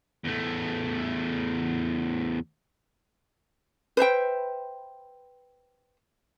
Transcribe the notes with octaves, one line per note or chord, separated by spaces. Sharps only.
E2 A3
B4 C5 E5 G5